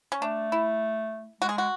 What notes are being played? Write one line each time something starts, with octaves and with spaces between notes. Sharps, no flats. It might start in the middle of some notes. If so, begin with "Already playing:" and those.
C#4
A3 D4
E4
G#3 F#4
G#4
F#4